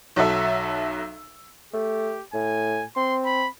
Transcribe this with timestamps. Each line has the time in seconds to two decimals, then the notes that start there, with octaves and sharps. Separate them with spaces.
0.16 B1 F#3 A4 E5 E6
1.74 A3 G4
2.34 A2 G#5
2.96 C4 C6
3.25 B5